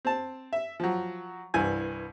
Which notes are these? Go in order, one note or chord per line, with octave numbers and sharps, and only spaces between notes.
C4 A5
E5
F3 F#3
C2 G2 E3 G#5